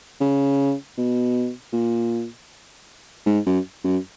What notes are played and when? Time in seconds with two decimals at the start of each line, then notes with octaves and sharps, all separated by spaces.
0.20 C#3
0.98 B2
1.73 A#2
3.26 G#2
3.46 F#2
3.84 F#2